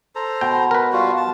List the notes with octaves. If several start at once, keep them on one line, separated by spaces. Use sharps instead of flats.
A4 C5 A#5
B2 G5
A#4 B4
G3 F4 F#4
A5